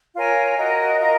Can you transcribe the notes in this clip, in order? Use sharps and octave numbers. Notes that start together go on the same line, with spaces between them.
F4 A#4 C#5 G#5
F#4 A#4 D#5
F4 A#4 D#5 A#5